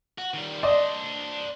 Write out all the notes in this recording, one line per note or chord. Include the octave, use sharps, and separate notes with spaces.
F#4
D#3 G3
D4 C5 D5 D#5